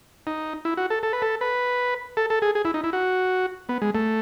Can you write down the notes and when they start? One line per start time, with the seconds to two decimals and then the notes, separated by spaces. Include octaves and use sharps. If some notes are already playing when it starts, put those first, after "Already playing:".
0.27 D#4
0.65 E4
0.77 F#4
0.90 A4
1.03 A4
1.13 B4
1.22 A4
1.41 B4
2.17 A4
2.30 A4
2.42 G#4
2.55 G#4
2.65 E4
2.74 D#4
2.84 E4
2.93 F#4
3.69 B3
3.82 G#3
3.95 A3